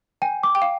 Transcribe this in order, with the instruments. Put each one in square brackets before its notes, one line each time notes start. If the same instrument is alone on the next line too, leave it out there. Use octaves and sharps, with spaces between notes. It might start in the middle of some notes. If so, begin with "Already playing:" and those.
[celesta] G5 [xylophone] G#5
[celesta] D6
[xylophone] G5
F5